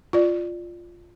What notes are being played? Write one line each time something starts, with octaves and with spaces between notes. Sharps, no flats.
F4 D5